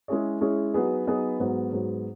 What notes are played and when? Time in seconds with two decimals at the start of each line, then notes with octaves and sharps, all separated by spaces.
0.08 G#3 C#4 E4 G#4 C#5
0.41 G#3 C#4 E4 G#4 C#5
0.74 F#3 B3 D#4 G#4 B4
1.07 F#3 B3 D#4 G#4 B4
1.40 G#2 F#3 B3
1.72 G#2 F#3 B3